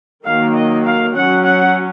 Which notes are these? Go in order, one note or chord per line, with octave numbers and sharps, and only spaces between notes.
D#3 F#3 A#3 F5
D#5
F5
F#3 C#4 F#5
F#5